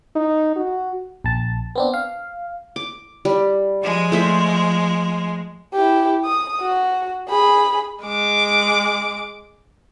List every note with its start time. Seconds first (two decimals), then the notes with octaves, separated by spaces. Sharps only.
0.15 D#4
0.56 F#4
1.24 A#1 A5
1.76 B3 C4 D4
1.94 F5
2.76 D6
3.25 G3
3.81 F3 G#3
4.12 A3 C5 E5
5.74 E4 G4
6.25 D#6
6.61 F#4
7.29 G#4 B5
8.04 G#3 D6